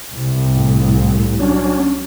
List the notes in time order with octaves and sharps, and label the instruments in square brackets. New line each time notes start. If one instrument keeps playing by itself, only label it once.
[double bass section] C2
[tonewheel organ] A2
F#3 C#4 D4